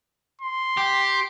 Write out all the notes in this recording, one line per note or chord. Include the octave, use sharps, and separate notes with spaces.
C6
G4